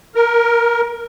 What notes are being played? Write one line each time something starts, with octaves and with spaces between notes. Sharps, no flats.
A#4